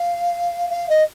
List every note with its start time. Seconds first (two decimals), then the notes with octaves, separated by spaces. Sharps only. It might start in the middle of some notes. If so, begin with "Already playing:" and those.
Already playing: F5
0.70 F5
0.89 D#5